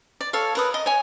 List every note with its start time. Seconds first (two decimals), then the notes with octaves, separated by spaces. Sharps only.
0.21 D5
0.33 A4 C#5 F5
0.55 A#4 B4 D#6
0.74 D#5
0.86 C#5 G#5